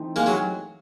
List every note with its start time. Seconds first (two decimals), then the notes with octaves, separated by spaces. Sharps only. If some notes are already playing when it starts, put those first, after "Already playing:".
Already playing: E3 A3 C4 D#4
0.16 G#3 A#3
0.26 F#3 G#3